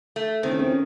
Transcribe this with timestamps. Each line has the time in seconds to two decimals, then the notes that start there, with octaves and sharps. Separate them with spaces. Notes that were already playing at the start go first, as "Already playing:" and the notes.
0.16 A3
0.43 D#3 C4
0.51 C#4
0.59 C4
0.66 C#4